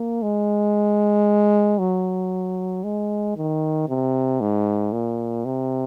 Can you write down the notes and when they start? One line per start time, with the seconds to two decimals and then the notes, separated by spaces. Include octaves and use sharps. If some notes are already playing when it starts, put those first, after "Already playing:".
Already playing: A#3
0.22 G#3
1.79 F#3
2.84 G#3
3.36 D#3
3.89 C3
4.41 G#2
4.92 A#2
5.45 C3